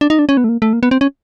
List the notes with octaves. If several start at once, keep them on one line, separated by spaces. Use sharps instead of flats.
D4
D#4
D4
C#4
B3
A3
A#3
A3
A#3
B3
C4
C#4